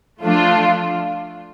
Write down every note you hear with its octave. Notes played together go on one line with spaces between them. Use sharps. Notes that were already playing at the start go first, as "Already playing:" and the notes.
F3 A3 D4 F4